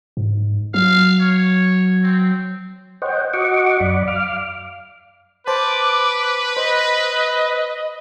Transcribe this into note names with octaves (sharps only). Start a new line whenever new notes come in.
G#2
F#3 F5
C#5
C4
C5 C#5 D#5 F#5 G5
F#4 D#5 F#5 C#6 D6
F#2 D5 B5
F5 D6 F6
B4 C5 A5 D6
C5 D#5